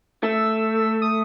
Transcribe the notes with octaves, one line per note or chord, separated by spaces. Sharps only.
A3 E6
D#6